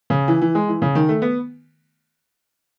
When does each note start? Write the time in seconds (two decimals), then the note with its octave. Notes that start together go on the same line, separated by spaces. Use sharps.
0.10 C#3
0.28 E3
0.41 E3
0.55 G#3
0.68 E3
0.82 C#3
0.95 D#3
1.09 A3
1.22 B3